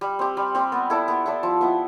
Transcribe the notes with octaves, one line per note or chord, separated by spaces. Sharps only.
G3
C4 G4
G3
C4 G4
B3
E4 A4 D5
B3
E4 A4 D5
F3
B3 E4